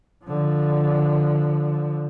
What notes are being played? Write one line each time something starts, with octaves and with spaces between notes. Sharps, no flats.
D3 F3